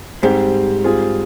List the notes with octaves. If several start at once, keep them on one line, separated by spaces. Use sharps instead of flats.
G#2 G3 C4 G4 C5
G3 C4 F4 G#4